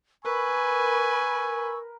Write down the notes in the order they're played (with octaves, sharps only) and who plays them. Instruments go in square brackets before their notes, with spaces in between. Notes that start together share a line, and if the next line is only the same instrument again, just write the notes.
[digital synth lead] A#4 [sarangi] B4 [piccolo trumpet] G#5 [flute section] B5 C#6 E6